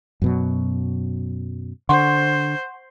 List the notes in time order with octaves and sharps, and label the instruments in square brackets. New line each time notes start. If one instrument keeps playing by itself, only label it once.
[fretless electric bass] F#2 B2 F#3
[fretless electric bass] D3 [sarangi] C5 [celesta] F#5 C6 C#6